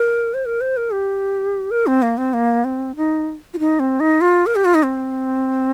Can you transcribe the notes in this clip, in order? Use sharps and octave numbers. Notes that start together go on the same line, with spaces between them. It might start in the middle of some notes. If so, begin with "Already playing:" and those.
Already playing: A#4
C5
A#4
C5
A#4
G4
A#4
C4
A#3
C4
A#3
C4
D#4
F4
D#4
C4
D#4
F4
A#4
G4
F4
D#4
C4